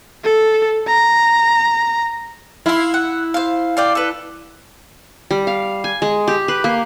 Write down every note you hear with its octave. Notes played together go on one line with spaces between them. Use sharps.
A4
A#5
E4 F5 C6
F#5
C5 F5
F4 D5 G5
A4 B4
G3
F5
G#5
G#3
G4
B4
A#3